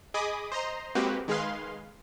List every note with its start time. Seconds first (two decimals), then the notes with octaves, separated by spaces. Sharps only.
0.14 G#4 D#5 G#5 B5 D6 D#6
0.52 C5 D#5 A#5 C6
0.95 G#3 A#3 C4 F#4 G4 B4
1.28 D#3 G#3 G#4 B4 F5 C6